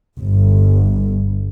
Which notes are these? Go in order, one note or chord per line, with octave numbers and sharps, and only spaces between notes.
G1